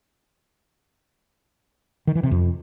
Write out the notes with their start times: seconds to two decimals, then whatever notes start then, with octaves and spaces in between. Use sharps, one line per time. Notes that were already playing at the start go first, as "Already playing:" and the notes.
2.07 D#3
2.15 E3
2.23 C3
2.31 F2